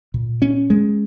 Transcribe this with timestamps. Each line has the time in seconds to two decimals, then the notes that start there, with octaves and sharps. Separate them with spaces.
0.14 A#2
0.42 C#4
0.70 G#3